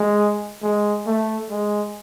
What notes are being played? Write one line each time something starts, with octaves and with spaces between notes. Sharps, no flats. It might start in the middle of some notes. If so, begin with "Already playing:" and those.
Already playing: G#3
G#3
A3
G#3